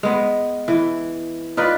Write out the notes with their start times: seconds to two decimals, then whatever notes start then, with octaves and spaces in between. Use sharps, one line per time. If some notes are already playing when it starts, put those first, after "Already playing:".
0.03 G#3 B3
0.68 E3
1.57 D#4 F4 B4 D5